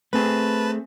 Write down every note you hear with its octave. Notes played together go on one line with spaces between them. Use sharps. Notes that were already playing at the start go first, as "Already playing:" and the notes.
A3 C4 G#4 B4 A5